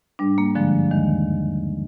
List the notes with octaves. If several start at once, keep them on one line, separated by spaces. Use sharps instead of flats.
G#2 G3 D4
A#3
G2 D3 F3 G#3
D#2 D#3 G#3